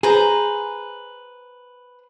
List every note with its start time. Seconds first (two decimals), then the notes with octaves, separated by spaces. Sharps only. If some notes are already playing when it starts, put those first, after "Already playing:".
0.03 G#4 B4 C5 A#5